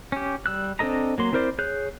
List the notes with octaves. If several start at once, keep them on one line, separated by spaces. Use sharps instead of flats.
C#4 G4
G3 E6 F#6
C4 D4 A4 D#5 A#5
F#3 A#3 C6
C4 E4 A#4 C5 D5
G#4 C#5 F#6 G6